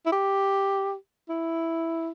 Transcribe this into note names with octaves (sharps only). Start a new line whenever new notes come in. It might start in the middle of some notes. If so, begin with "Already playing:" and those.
E4
G4
E4